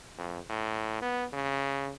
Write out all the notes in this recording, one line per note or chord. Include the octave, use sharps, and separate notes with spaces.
F2
A2
B3
C#3